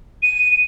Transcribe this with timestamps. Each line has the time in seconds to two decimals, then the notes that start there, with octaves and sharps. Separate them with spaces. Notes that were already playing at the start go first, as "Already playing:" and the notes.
0.23 D#7